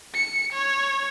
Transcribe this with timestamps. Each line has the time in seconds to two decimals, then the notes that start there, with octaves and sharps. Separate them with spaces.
0.14 C#7
0.53 C#5